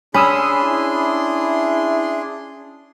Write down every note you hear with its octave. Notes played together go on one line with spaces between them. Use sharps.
C#4 D4 G#4 B5 C6 D#6 E6
E4